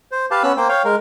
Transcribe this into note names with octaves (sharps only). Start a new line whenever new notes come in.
C5
G4 B4 F5 A5
B3 C#4 E6 F#6
A#3 C5 G5
C#5 F5 G5
G#3 A#4